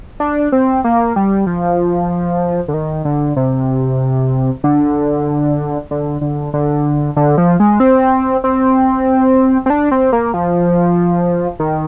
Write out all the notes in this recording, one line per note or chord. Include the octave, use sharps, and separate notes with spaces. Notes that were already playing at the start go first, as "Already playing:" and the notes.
D4
C4
A#3
G3
F3
D3
D#3
D3
C3
D3
D3
D3
D3
D3
F3
G#3
C4
C4
C4
D4
C4
A#3
F3
D#3